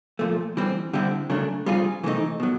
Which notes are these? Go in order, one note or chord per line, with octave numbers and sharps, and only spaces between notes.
A#2 F3 A3
E3 G3 C4
D3 G3 C4 E4
C#3 F#3 A3 D4
G3 C4 F4 G#4
C3 E3 A3 C4 D#4
B2 F#3